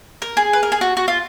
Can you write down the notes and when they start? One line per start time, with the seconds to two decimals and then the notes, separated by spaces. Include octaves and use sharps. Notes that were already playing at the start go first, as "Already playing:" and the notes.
0.22 A#4
0.37 G#4
0.53 B4
0.63 A#4
0.72 G#4
0.81 F#4
0.97 F#4
1.08 F4